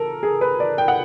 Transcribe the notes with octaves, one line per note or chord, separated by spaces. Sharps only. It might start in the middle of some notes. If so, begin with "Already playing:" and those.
Already playing: A4 A#4
G#4
B4
D5
G5
F#5